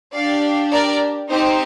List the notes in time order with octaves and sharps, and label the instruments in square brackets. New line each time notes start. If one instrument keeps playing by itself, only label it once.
[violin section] D4 G4 D5 F5
A#4 D5
C4 D#4 G4 C5